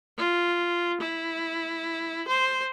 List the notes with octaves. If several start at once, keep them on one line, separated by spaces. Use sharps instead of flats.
F4
E4
C5